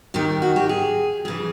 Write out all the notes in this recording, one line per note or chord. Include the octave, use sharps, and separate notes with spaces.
D#2 D#3 G4
F#4
G4
G#4
F2 C#3 E3 G#4